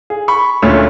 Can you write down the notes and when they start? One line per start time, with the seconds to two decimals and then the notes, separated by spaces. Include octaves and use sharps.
0.10 G#4
0.28 B5 C#6
0.62 D2 A#2 A3 C#4